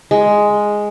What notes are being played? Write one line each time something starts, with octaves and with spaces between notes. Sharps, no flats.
G#3